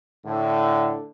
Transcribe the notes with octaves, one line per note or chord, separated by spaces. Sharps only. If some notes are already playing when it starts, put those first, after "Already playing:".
A2 D3